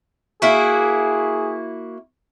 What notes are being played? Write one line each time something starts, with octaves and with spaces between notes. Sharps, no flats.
A#3 E4 F#4 G#4